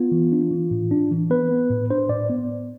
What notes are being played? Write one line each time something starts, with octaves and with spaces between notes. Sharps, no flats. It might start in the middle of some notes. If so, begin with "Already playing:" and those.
Already playing: B3 F4
E3
D4
E3
A2
D4
E3
B3 B4
B3
A2
D4 C5
A2 D5
B3